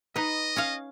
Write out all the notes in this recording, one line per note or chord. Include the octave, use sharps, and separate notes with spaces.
D#4 B4 D#5
C#4 C#5 F5